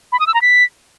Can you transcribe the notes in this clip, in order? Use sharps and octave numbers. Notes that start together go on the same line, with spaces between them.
B5
D#6
E6
A#5
B6